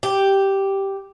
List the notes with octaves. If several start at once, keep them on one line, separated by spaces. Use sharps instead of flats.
G4